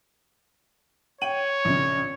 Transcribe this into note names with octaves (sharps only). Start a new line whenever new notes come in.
C#5 G5 D#7 F#7
A#1 C#3